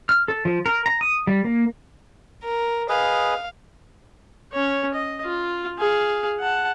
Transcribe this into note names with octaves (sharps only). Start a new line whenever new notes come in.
F6
A4
F3
A#4
A#5
D#6
G3
A#3
A#4
G#4 B4 D#5 F5
C#4 C#5
D#5
F4
G#4 F5
F#5 A5